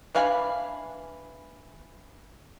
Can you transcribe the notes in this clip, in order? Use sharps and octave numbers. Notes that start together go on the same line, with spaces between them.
E3 D4 F5 G#5 B5